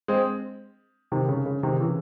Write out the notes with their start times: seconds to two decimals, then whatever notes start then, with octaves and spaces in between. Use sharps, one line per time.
0.08 G#3 C4
1.12 C3 D#3
1.28 C#3
1.46 C#3
1.63 C3 D#3
1.80 C#3 E3